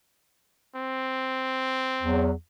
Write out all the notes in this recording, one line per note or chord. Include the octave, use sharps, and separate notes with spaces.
C4
E2 F#3